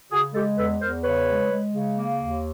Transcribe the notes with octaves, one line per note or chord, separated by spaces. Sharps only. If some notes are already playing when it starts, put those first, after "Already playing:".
C#3 F#4 G#4
G#3 G4 A4
E2 A4 B4
E2 A#4 C5
C#3 B4 C#5
G#3
G#3
C#3
A#3
D#2